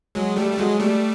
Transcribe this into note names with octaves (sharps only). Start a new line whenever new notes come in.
F#3 G#3
G3 A3
A3
F#3 G#3
G3 A3